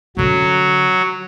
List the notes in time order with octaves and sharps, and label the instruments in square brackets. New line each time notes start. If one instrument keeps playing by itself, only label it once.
[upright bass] D3 C#4 [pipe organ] F#3